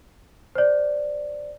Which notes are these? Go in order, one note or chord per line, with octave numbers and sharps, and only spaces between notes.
C5 D5